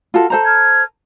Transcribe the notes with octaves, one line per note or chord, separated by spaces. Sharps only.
F4 F#4 A4
A4 C5 A#5
F6 G#6